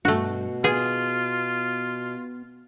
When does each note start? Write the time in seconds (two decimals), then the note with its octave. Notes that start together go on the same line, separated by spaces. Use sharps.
0.05 G2 B2 A3 F#4
0.64 B3 F4 G#4